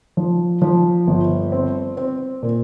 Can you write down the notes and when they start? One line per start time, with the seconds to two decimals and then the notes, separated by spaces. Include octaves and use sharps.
0.17 F3
0.62 F3
1.07 G1
1.52 C4
1.97 C4
2.42 A#2